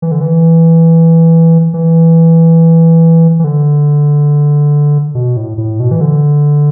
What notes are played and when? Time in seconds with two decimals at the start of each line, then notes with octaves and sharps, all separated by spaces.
0.02 E3
0.12 D3
0.21 E3
1.74 E3
3.39 E3
3.44 D3
5.15 B2
5.37 A2
5.58 A2
5.80 B2
5.91 E3
6.01 D3